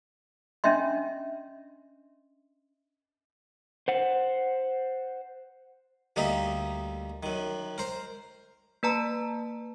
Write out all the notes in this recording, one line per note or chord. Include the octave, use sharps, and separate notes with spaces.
C#4 D4 D#5 E5 C6
C5 F#5
D2 G3 A#3 D#4 D#5 E5
F#2 D#3
A#4 C5
A#3 B4 A5 A#5